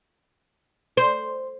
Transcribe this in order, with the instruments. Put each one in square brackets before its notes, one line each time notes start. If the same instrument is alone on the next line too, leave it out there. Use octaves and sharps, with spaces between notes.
[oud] C5